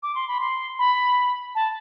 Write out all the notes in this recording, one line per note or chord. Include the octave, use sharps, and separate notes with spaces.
D6
C6
B5
C6
B5
A5